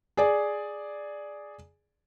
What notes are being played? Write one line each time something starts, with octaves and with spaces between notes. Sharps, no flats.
G#4 D5